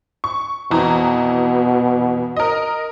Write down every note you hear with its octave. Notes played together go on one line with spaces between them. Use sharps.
C#6
F2 B2 E3 A#5
A#4 D#5